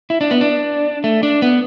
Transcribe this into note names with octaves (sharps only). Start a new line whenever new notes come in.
E4
D4
B3
D4
A3
D4
B3